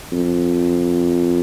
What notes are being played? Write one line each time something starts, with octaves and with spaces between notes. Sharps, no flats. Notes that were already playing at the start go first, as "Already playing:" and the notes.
F2